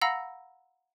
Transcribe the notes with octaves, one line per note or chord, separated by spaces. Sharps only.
F5 F#5 A#5 B5 E6 A#6